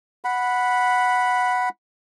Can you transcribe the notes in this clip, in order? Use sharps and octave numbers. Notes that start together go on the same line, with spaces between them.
F#5 B5